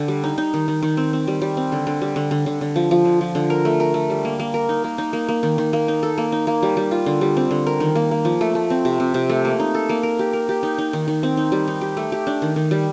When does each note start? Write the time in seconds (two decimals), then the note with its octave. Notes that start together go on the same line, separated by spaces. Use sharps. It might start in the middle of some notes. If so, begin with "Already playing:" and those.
Already playing: D3 G4
0.08 G3
0.24 D#4
0.38 D#4
0.54 D#3
0.68 D#3
0.83 D#3
0.97 C4
1.13 C4
1.27 G3
1.42 G3
1.57 C4
1.72 D3
1.87 D3
2.02 G3
2.16 D3
2.31 D3
2.46 D3
2.61 D3
2.76 F3
2.91 F3
3.05 D3
3.21 F3
3.35 D3
3.50 A#4
3.65 A3
3.80 A#4
3.94 A3
4.10 G3
4.25 A#3
4.40 A#3
4.54 A#4
4.69 D#4
4.84 A#3
4.98 D#4
5.13 A#3
5.29 A#3
5.43 D#3
5.58 D#3
5.73 A#3
5.88 D#4
6.03 A4
6.18 A#3
6.32 D#4
6.47 A#3
6.62 G3
6.77 G3
6.91 F4
7.06 D3
7.21 G3
7.37 C4
7.51 D3
7.67 A#4
7.80 D#3
7.95 A#3
8.11 A#3
8.25 F3
8.41 A3
8.55 A3
8.70 C4
8.85 C3
9.00 C3
9.14 C3
9.29 A3
9.45 A#3
9.60 D#4
9.75 A4
9.89 A#3
10.03 A#4
10.19 G4
10.33 A#4
10.49 G4
10.63 D#4
10.78 D#4
10.93 D#3
11.08 D#3
11.23 C4
11.37 D#4
11.52 G3
11.68 D#4
11.81 G4
11.97 A3
12.12 G4
12.27 D4
12.42 D#3
12.56 D#3
12.71 G3